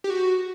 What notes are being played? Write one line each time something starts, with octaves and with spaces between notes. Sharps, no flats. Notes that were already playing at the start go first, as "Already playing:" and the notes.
G4
F#4